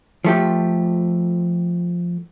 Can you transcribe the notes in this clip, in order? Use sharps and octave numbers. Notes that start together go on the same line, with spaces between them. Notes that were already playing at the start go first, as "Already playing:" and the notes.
F3 A3 G4